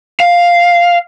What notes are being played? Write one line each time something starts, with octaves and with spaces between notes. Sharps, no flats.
F5